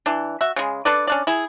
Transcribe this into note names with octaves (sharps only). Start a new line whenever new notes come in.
E3 D4
F#4 E5
C#3 G#3
D4 A4 B4 D5
C#4 D4 D5
E4 G#4